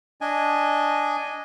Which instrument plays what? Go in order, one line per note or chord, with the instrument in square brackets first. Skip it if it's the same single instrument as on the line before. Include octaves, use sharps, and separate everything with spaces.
[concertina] D4 D#5 G#5